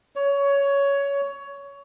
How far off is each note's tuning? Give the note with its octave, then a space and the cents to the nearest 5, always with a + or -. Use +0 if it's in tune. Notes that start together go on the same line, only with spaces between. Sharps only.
C#5 +15